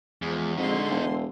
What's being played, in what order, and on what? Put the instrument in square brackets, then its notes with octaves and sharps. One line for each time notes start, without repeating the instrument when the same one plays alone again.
[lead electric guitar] E2 [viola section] F3 G#3
[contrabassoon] F2 [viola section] D3 G#3 C6 [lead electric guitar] D#4 F#4
[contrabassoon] E1